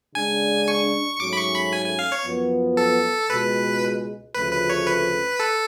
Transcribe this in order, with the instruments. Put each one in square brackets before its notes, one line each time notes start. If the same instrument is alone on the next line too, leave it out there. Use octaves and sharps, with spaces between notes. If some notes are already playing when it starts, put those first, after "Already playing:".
[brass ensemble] C#3 G#3 D4 [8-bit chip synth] G#5
[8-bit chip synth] C#6
[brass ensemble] G#2 F#3 A3 C#4 [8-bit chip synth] D6
[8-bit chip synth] B5
C#6
B5
G#5
G#5
F5
C#5
[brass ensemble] F#2 F3 B3
[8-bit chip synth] A4
[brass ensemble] C#2 B2 G#3 [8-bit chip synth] B4
[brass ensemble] D2 C#3 F3 A3 [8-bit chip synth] B4
[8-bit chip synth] B4
C#5
B4
A4